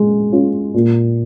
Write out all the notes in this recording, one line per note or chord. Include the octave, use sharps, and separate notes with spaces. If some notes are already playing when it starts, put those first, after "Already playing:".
Already playing: G#3
C#4 F4
A#2